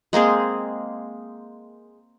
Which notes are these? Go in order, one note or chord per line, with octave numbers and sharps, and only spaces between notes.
G#3 A#3 C4 G#4